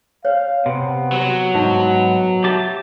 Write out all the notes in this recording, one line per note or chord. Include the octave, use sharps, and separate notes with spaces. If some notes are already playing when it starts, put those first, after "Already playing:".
C#5 F5
C3 B3
F#3
G#2 D#4
G4 E5 A5